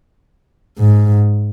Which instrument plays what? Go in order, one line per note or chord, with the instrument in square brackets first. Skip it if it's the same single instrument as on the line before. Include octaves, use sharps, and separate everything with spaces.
[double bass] G#2